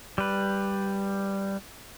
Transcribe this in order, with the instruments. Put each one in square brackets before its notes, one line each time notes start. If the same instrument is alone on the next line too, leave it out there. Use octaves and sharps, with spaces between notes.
[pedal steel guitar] G3 B4